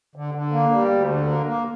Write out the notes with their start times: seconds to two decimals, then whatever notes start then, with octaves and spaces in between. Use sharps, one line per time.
0.16 D3
0.34 D3
0.52 A#3
0.72 G3
0.91 D2
1.10 D3
1.28 A#3
1.46 A#3